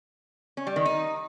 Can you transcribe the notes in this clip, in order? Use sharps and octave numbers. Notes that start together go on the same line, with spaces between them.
C#4
G3
D#3
D#4